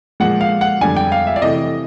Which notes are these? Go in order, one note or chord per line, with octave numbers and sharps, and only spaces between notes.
A#2 F3 G#3 F#5
F5
F#5
F2 D3 G3 G#5
G5
F5
E5
D5
C3 E3 A3 D#5